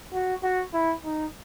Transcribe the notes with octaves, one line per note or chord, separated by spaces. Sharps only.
F#4
F#4
E4
D#4